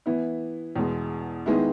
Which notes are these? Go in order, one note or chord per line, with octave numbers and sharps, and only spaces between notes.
E3 B3 E4
E2 B2 G#3
D#3 G#3 B3 E4